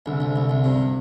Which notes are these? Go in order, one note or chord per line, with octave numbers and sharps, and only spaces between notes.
C2 D3
C2
C2
C2
G2 C3